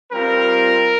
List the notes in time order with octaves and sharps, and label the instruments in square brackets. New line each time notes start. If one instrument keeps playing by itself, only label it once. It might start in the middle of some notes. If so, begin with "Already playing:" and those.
[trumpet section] G3 C4 F4 A#4